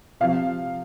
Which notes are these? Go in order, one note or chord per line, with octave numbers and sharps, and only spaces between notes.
C3 F3 F5